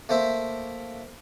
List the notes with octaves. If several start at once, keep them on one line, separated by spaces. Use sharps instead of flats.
A3 A#3 C5 E5